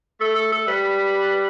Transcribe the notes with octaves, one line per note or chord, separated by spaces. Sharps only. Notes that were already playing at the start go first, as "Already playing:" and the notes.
A3 A4
A4
A4
G3 B4